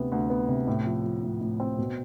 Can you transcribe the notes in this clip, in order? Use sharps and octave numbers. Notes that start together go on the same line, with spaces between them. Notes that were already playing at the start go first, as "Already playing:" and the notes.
Already playing: D2 C3 B3
D2
B3
C3
A2
F3
F3
A2
A2
C4
B2